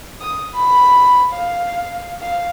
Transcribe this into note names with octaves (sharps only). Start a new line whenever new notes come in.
D#6
B5
F5
F5